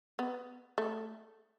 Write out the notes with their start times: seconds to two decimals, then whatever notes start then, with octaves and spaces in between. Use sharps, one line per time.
0.19 B3
0.78 A3